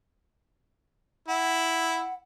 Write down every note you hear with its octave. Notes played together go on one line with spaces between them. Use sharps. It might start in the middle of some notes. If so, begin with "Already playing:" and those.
E4 F#5